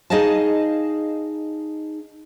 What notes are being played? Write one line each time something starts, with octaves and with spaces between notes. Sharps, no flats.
D#4 G#4 D#5 F5 A5